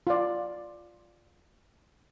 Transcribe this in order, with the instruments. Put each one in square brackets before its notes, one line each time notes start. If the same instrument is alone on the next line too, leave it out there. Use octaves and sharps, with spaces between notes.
[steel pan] F4 D5